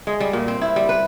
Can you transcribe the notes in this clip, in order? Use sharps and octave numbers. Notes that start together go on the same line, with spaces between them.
G#3
G3
A#2
C4
E4
G3
B4